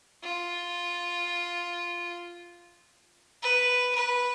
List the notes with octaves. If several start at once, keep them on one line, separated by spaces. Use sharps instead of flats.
F4
B4
B4